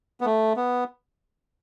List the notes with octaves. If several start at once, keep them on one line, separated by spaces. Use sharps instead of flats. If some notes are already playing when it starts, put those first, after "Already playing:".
B3
A3
B3